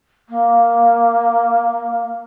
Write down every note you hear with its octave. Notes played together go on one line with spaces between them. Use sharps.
A#3